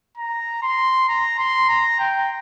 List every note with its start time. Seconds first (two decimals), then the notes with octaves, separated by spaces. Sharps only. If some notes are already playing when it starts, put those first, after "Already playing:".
0.17 A#5
0.63 C6
1.09 A#5
1.38 C6
1.69 A#5
1.99 G5